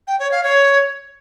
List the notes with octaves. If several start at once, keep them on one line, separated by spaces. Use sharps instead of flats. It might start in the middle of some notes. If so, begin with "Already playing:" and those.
G5
C#5
F5
C#5